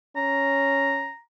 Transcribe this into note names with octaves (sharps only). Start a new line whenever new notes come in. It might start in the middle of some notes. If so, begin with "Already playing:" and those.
C#4 A#5